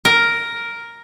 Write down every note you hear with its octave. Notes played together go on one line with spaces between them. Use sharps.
A#4